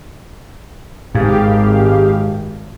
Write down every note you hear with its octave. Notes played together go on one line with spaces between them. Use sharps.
G#1 G#2 G4 G#4 F5